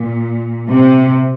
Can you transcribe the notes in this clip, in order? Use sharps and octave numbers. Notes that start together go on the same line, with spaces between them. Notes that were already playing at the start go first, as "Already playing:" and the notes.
Already playing: A#2
C3